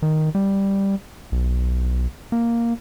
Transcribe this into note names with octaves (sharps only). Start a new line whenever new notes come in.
D#3
G3
B1
A#3